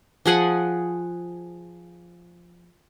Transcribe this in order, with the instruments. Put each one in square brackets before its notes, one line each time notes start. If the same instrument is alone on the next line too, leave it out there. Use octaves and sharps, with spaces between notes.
[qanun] F3 G#4 F#5 G#5